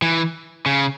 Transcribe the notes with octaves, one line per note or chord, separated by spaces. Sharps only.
E3
C#3